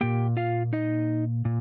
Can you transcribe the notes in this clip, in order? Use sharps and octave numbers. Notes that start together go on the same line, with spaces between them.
A#2 A#3 G4 G5
F4 F5
D#4 D#5
A#2